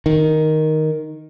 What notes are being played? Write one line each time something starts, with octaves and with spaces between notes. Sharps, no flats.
D#3